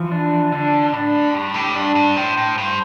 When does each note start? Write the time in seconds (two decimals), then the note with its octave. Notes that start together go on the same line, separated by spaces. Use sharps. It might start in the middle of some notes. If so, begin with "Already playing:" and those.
Already playing: E3 F3
0.12 D4
0.52 D3 D4
0.93 A2 D4
1.34 G2 G4
1.54 A2
1.75 G2 D4
1.95 G2
2.16 A2 C5
2.37 A2
2.58 G2 C5